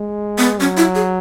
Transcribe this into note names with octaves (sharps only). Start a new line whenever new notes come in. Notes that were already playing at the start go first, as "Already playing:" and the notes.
Already playing: G#3
B3
F#3 C#4
E4
G#4